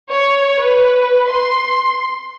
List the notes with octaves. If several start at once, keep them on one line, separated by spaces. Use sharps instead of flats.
C#5
B4
C6